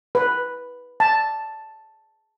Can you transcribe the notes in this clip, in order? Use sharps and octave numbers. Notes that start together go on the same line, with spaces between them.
B4
A5